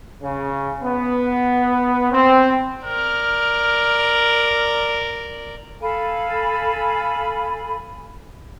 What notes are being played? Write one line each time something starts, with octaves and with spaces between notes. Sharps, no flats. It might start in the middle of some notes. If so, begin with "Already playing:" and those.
C#3
B3
C4
A#4 D5 F6
A4 F5 G#5 B5